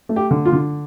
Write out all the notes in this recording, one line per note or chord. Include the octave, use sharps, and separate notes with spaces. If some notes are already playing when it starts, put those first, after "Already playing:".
A3
G4
D3
F4
D3